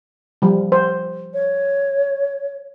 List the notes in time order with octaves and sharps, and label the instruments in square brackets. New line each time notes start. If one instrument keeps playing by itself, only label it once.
[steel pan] F3 G3
C5
[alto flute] C#5